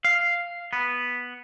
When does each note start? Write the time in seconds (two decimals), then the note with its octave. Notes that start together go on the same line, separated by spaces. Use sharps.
0.05 F5
0.73 B3